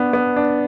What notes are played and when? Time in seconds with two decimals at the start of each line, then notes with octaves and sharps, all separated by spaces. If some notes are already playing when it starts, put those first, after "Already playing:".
Already playing: B3 D4
0.13 B3
0.36 D4